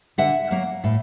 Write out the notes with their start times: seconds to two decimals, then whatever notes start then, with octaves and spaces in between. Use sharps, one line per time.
0.18 D3 E5 F#5
0.51 F#3 A#3
0.84 A2